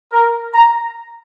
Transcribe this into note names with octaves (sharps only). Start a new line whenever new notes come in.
A#4
A#5